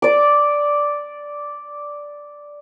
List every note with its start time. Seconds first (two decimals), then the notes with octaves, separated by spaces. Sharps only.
0.02 D5 D6